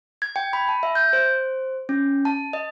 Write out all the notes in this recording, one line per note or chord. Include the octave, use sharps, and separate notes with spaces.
G#6
G5
B5
A5
E5
G6
C5
C#4
A5
D#5